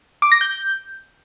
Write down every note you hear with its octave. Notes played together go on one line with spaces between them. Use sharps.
D6
A#6
G6